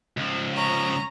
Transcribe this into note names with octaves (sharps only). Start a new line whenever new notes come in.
C#2 F3
C#4 A#5